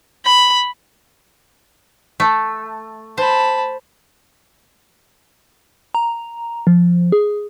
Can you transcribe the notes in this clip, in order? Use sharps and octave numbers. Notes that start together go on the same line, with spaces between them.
B5
A3
C5 A5 B5
A#5
F3
G#4